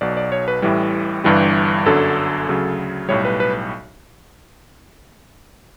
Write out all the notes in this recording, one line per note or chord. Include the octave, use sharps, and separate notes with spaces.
B1 B2 F#3 D5
D5
C#5
B4
A1 A2 E3 G3
G1 G2 E3 G3
G1 F#2 D3 F#3 A4
D2 C#3 F#3
B1 A2 G3 C#5
B4
B4